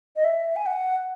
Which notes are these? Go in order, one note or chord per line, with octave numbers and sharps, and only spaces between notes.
D#5
E5
G#5
F#5